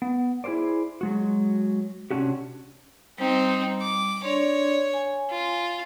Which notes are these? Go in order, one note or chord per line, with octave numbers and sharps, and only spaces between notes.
B3
E4 G#4 A#4 C5 D5
F#3 G#3 F#4
C3 E3 C#4 D4 F#4 G4
G3 C4 D#4
D6
D4 C#5 D5 C6
G#5
F4